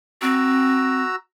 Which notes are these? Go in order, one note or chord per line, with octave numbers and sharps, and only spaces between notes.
C4 F#4 A#5 E6